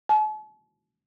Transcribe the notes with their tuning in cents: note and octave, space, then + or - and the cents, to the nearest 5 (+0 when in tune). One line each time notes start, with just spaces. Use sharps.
A5 -45